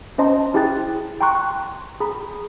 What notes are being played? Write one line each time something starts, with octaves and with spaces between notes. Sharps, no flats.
C#4 C5 D#5 A5 A#5 C6
E4 G4 G#4 G5 F#6 A6
G5 A5 A#5 C6 C#6 F#6
G#4 A#5 B5